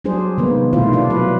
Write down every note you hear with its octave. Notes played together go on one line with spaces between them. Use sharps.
F#3 G3 D4 G#4 C5
C3 D#3 G3 G#3 A#3 B3
B2 D#3 A3 E4 F4 C5
F3 D4 F4
F#3 B4